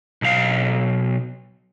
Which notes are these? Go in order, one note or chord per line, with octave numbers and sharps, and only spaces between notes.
B1 F5